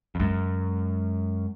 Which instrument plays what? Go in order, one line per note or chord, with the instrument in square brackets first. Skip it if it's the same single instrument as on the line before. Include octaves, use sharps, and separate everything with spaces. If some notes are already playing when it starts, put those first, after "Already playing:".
[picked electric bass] F2
[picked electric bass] F#2 [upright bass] G#3